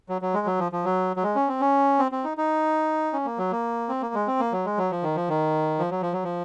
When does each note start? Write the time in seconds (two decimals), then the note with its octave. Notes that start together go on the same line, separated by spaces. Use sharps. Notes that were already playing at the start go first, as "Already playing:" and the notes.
0.09 F#3
0.22 F#3
0.34 G#3
0.46 F#3
0.59 F3
0.72 F3
0.85 F#3
1.16 F#3
1.23 G#3
1.35 C#4
1.48 C4
1.61 C#4
1.99 C4
2.12 C4
2.24 D#4
2.37 D#4
3.13 C#4
3.25 A#3
3.38 F#3
3.52 A#3
3.89 C4
4.02 A#3
4.14 G#3
4.27 C4
4.40 A#3
4.53 F#3
4.65 G#3
4.78 F#3
4.91 F3
5.03 D#3
5.16 F3
5.29 D#3
5.79 F3
5.91 F#3
6.02 F3
6.13 F#3
6.24 F3